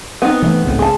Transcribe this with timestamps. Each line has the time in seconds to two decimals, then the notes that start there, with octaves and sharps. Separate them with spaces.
0.22 B3 C4 D#4
0.42 E3 G#3 A3
0.64 G#1 C#2 A2
0.79 G#3 A5